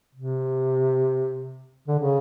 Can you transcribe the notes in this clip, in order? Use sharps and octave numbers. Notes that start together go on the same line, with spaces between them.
C3
D3
C#3